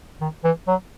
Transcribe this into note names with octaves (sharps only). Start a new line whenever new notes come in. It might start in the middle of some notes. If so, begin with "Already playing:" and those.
D#3
E3
F#3